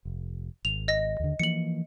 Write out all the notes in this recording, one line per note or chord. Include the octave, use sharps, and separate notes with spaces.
F1
G#1 F7
D#5 A#6
D#2 D3
E3 F3 A#3 C#7 F#7